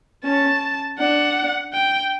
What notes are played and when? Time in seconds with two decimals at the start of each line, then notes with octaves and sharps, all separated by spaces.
0.24 C#4 A5
0.99 D4 F#5
1.73 G5